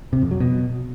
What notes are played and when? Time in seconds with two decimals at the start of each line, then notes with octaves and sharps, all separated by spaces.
0.13 C3
0.22 F2
0.31 F#3
0.40 B2